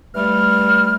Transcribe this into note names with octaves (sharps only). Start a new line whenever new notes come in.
G2 G3 A3 F6